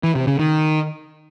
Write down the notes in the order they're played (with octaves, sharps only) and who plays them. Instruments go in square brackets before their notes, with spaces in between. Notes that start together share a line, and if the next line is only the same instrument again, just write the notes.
[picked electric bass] E3
C3
C#3
D#3